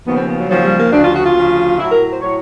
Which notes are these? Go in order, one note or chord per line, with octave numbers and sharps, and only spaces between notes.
D#2 C#3 F3 B3
C4
B3
F#3
D#2 C#3 F3 F#3
G3
A#3
D2 C#3 F3 D4
F4
F#4
F4
D2 C#3 F3
A2 F#3 E4
A#4
C5
A2 F#3 C#5